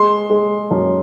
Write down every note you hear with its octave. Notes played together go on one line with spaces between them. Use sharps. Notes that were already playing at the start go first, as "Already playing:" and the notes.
Already playing: G#3 C6
G#3
F#2